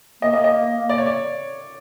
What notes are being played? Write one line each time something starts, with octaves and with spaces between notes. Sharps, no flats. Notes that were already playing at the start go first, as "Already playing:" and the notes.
A#3 D#5
D#5
D#5
D5
C#5
D5